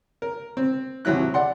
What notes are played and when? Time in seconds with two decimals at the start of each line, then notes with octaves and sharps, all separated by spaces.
0.22 A#4
0.57 C4
1.05 D#2 C3 F#3 E4 F#6
1.34 D5 F#5 C6